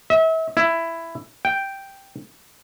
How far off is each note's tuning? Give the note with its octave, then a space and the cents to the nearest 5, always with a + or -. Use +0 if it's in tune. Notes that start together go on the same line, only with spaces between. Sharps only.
E5 -35
E4 +10
G5 +0